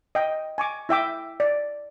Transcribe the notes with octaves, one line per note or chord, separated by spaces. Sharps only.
D#5 G5
G#5 C#6 D6
E4 E5 G5 D6
D5